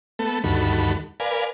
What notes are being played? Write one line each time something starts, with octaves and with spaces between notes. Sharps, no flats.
A3 B3 A4
D2 G2 D#3 F#4 A4 B5
A#4 B4 D5 F5 G#5